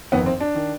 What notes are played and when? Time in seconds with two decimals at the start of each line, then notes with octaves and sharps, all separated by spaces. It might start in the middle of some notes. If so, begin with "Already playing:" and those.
0.12 G1 F2 D#3 B3
0.26 C4
0.40 D4
0.55 D#3